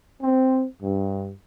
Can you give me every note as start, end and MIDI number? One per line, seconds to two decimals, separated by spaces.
0.23 0.64 60
0.82 1.30 43